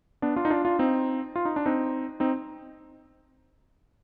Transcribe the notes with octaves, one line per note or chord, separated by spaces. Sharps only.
B3 D4
D4 F4
D#4
D4 F4
D4 F4
C4 D#4
F4
D#4
D4
C4 D#4
C4 D#4